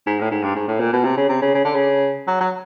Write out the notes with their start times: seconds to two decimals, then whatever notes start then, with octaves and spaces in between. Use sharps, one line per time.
0.07 G#2
0.21 A2
0.31 G#2
0.44 G2
0.56 G#2
0.68 A2
0.80 A#2
0.93 B2
1.05 C3
1.17 C#3
1.29 C3
1.42 C#3
1.55 C#3
1.65 D3
1.75 C#3
2.28 F#3
2.41 F#3